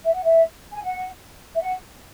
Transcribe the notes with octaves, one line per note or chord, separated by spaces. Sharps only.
E5
F#5
E5
G#5
F#5
E5
F#5